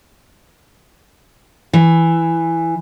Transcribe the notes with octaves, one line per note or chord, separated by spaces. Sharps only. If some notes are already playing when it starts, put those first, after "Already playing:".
E3